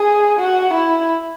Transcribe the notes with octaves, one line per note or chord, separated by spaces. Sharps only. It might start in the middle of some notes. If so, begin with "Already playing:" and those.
Already playing: G#4
F#4
E4